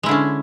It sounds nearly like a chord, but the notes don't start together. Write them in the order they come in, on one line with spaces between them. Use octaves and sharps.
G#3 E4 D3 C#4